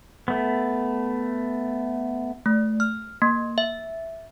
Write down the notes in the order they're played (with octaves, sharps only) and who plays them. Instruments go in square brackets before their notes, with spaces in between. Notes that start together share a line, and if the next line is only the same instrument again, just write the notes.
[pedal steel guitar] A3 B3
[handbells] A3
F6
A#3
E5